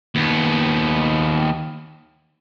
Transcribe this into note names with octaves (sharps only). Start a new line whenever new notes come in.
D#2 B3